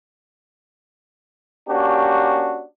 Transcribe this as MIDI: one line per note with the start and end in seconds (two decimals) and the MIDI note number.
1.69 2.64 58
1.69 2.64 61
1.69 2.64 62
1.69 2.64 66
1.69 2.64 67